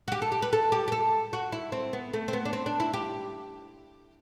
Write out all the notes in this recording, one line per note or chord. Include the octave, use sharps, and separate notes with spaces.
F#4
G4
A4
G4
B4
A4
G4
G4
A4
F#4
E4
C4
B3
A3
C4
B3
D4
C4
D4
E4
G4